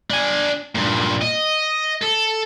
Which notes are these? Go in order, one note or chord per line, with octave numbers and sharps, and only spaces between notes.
D4 G#5
G2 A#2
D#5
A4